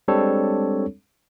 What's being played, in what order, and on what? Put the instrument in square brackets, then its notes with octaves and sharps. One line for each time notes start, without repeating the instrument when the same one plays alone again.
[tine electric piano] G3 G#3 C4 D4 A4 C#5